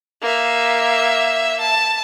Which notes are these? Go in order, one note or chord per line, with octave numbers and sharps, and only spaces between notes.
A#3 E5
A5